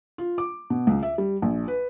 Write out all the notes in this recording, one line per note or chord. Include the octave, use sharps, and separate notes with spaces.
F4
D6
B2
C#2
E5
G3
A#1
B4